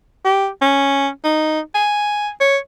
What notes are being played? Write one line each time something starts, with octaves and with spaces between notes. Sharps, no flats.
G4
C#4
D#4
G#5
C#5